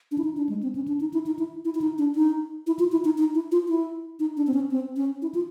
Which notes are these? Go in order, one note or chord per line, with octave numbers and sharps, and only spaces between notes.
D4
E4
D#4
D4
G#3
C4
C#4
D4
D#4
E4
D#4
E4
E4
E4
D#4
D4
D#4
E4
F4
E4
D#4
D#4
E4
F4
E4
D#4
D4
C4
C#4
C4
C#4
E4
F4